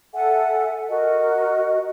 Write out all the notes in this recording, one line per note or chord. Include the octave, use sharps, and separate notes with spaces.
A4 E5 F#5 G#5
F#4 A#4 D#5